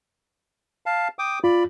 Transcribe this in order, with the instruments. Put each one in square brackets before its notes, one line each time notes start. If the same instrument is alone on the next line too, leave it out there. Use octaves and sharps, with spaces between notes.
[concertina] F5 A5
G5 D6 D#6
[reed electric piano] F4 [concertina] D5 B5